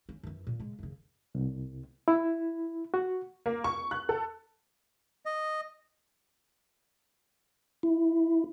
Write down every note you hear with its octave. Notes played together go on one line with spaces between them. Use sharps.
C#4
F#2 E3
A#2
C#3 G#3
F#2 C#3
C2
E4
F#4
A#3
C#6
F#6
A4
D#5
E4